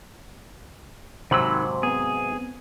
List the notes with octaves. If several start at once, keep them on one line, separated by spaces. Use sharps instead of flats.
G#2 C3 D#3 F#3 C5 B5 E6
B3 C4 G#4